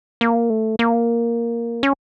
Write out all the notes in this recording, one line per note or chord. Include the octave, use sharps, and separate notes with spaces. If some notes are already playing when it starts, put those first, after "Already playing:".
A#3
A3
A#3
C#4